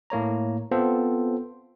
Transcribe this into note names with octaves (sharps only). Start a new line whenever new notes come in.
A2 A#3 C#5 A#5
B3 C4 F4 A4 C5